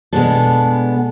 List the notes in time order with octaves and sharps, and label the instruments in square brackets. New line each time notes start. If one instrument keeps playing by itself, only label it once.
[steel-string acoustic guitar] B2 G#3 B3 D4 A4